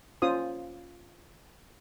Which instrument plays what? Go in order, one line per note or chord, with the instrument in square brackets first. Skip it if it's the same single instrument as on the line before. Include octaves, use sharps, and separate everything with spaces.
[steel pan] C#4 F4 C5 D#6